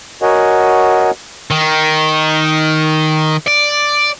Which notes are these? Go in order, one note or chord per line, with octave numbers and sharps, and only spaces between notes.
F#4 A#4 C#5 D#5 F#5 G#5
D#3
D5